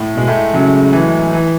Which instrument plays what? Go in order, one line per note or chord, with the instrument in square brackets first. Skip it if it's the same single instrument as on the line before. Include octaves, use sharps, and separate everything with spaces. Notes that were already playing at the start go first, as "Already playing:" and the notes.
Already playing: [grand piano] A2 A3
[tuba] B2 [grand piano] G#3
[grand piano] A2 A3
[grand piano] F#2 F#3 [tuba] C#3
[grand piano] E3
E3